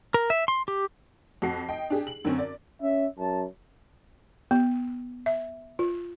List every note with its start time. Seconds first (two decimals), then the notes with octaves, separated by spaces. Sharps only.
0.14 A#4
0.30 E5
0.48 C6
0.68 G4
1.42 F2 F#4 C7
1.68 D#5 G5
1.90 D4 G4 G#4
2.07 F#7
2.24 F#2 D3 C4 C#4
2.38 D5
2.82 C#4 E5
3.18 F#2 A5
4.51 B3
5.26 E5
5.79 F4